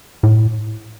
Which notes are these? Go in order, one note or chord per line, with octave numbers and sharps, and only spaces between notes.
A2